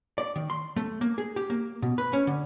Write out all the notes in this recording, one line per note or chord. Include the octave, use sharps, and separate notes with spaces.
D5
D#3
C6
A3
A#3
G#4
G4
A#3
B2
B4
C#4
D3